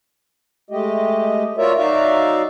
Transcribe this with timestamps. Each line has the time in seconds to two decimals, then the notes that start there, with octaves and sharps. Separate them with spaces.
0.70 G#3 A3 G4 D#5
1.58 F4 F#4 A#4 C#5 D5 E5
1.77 F#3 D#4 F#4 D5 E5 F5